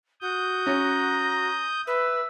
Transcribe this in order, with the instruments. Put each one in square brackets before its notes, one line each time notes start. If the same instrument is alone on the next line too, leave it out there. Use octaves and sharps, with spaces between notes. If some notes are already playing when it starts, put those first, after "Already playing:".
[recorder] F#4 [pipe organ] D#6 G6
[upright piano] C#4 [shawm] A#5
[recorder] B4 [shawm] E5